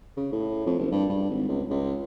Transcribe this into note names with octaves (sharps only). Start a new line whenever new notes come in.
C#3
A2
F2
F#1
G2
G2
G#1
C#2
C#2